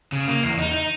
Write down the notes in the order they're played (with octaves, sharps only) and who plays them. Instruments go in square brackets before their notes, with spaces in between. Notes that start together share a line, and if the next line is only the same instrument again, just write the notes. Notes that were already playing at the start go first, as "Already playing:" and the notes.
[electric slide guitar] C#3
A#3
E2
D#4
D#4